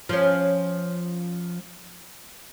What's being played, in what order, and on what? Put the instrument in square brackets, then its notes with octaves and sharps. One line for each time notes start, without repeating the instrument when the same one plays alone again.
[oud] F3 C#4